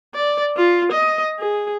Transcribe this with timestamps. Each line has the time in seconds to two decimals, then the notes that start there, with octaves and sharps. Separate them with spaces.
0.14 D5
0.57 F4
0.92 D#5
1.39 G#4